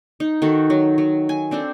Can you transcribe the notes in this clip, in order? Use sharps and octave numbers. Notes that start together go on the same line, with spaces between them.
D#4
D#3 F#4 A4
F#3
F#3
G#5
C4 D4 A4 C5